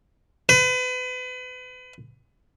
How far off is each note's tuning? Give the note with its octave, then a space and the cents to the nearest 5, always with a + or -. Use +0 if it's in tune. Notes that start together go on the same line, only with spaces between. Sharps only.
B4 +35